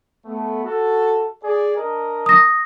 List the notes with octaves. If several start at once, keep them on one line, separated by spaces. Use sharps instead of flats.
A3 B3
F#4 A4
G#4 D5
D4 A#4 D#5
D#6 A#6